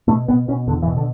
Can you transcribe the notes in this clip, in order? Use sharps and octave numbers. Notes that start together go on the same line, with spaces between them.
B2 A3
B2 B3
B2 C#4
E2 D3
E3
B2
D3